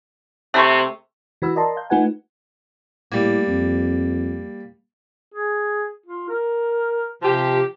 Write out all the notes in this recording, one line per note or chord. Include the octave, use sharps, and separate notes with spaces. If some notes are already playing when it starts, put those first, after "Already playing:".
C3 A3 B5 C#6
E3 F#4 B4 B5 E6
A#4 D5 D#5 A5 A#5 C6
F5 G6
A3 D#4 F4 B4 F#5 G#5
A2 G3 A#3
F2
G#4
F4
A#4
C3 F3 G4